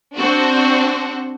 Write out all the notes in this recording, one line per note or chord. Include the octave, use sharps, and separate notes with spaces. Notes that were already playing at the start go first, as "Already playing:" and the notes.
C4 D4 F#4